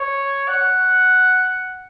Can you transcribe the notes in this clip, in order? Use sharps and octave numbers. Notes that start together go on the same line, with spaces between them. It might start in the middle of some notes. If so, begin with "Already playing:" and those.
Already playing: C#5
F#5